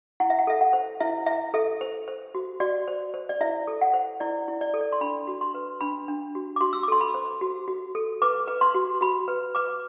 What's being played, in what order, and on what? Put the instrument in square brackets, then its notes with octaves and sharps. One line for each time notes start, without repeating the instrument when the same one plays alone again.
[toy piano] E4 F#5
E5
F#5
A4 E5
F#5
C5
E4 E5
E4 E5
A4 E5
C5
C5
F#4
F#4 D5
C5
C5
D5
E4 E5
A4
F#5
C5
E4 D5
E4
D5
A4
D5
C6
D4 B5
F#4
C6
B4
D4 B5
D4
F#4
D6
F#4 C6
E6
D6
A4 C6
B5
C5
F#4
F#4
A4
B4 D6
B4
C6
F#4
F#4 B5
B4
B4 D6